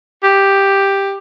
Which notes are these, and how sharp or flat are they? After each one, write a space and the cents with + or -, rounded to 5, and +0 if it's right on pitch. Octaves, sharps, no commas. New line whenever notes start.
G4 +5